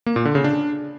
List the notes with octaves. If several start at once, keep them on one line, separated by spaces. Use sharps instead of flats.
A#3
A#2
D3
C#3
D4